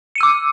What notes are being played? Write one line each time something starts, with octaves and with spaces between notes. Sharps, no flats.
D6 E6 C#7 D#7